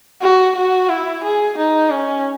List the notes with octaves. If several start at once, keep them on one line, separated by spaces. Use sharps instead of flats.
F#4
F#4
E4
G#4
D#4
C#4